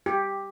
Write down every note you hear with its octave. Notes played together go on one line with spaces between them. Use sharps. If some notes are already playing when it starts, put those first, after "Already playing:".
G4